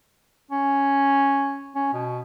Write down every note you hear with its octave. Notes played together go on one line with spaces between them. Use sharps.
C#4
C#4
B2